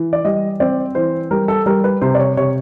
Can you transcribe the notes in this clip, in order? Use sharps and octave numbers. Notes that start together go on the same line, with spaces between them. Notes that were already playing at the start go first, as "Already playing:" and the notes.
Already playing: E3
D5
G3 D#5
C4 D5
E3 C5
G3 A#4
A4
G3 A#4
B4
C3 C5
D5
C#5
C3 C#5